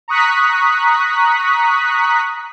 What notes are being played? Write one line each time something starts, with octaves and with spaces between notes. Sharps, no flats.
A#5 C#6 D#6 F#6 B6